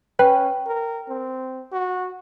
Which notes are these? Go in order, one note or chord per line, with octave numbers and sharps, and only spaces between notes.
C#4 B4 G5
A#4
C4
F#4